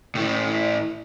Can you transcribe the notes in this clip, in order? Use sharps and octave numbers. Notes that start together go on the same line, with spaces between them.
A2 E3